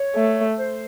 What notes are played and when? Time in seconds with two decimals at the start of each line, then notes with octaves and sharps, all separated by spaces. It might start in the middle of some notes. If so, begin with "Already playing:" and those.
Already playing: C#5
0.15 A3
0.58 C5